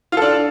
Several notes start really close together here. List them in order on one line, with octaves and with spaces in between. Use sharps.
F4 A4 D4